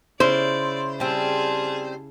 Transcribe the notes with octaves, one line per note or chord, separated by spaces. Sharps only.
C#3 E4 C5 D5
G3 C4 G#4 A5